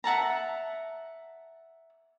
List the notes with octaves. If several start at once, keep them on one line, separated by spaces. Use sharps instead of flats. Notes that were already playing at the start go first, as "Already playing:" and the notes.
E5 F#5 A5 A#5